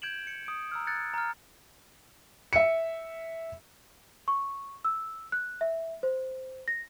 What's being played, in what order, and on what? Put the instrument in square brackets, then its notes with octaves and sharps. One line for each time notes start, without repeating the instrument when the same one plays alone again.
[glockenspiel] G6 G#6 D7 E7 F#7
C#7
D#6 D7
A#5 E6 F6
F#6 G#6 A6 C#7
A#5 F6
[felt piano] E5 C#7
[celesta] C#6
E6
F#6
E5
C5
A#6